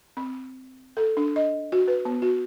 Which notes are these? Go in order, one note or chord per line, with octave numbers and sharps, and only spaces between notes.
C4
A4
D4
D#5
F#4
B4
B3
F#4